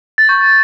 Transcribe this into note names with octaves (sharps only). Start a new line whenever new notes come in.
A6
C#6 G6